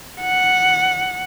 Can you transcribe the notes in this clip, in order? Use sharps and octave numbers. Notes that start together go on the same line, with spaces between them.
F#5